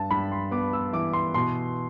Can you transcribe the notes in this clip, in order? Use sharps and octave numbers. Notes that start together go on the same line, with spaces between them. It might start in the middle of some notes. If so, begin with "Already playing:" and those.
Already playing: G2 A5
G2 B5
C6
B3 D6
E6
E3 D6
C6
B2 C6